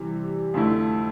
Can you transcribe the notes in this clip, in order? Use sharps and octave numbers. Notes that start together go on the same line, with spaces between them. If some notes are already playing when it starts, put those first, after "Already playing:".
Already playing: C3 E3 G3
F2 D3 A3 E4